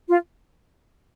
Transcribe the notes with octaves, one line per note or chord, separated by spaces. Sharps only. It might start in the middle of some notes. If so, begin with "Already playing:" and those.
F4